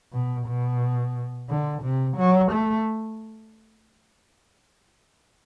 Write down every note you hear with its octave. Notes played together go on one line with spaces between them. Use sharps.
B2
B2
D3
C3
F#3
A3